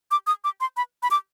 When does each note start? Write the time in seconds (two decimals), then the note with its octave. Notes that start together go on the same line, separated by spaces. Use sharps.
0.11 D6
0.27 D#6
0.44 D6
0.61 C6
0.77 B5
1.03 B5
1.11 D6